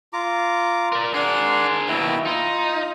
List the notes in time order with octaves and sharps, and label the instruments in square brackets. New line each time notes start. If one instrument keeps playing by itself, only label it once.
[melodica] F4 A#5 D6
[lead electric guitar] A#4 D5
[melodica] D4 F#5 C6 [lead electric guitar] G#4 A#4
[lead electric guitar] D#2 B2 [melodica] E4 G5
[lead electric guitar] D#4 [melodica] F4